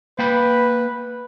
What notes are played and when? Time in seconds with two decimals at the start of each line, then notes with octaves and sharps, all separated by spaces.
0.19 A#3 B4 G5 B5